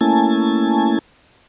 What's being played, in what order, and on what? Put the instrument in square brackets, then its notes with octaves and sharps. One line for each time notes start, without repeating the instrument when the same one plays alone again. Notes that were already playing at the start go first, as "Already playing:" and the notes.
[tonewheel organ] A3 A#3 C#4 E4 G#5 A5